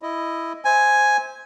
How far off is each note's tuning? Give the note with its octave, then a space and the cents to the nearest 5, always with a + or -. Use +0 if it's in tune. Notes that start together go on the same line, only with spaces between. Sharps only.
E4 +5 D#5 +0
C5 +0 E5 -30 G#5 +0